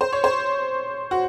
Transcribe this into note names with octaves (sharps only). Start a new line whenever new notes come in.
C5
C#5
C5
F#4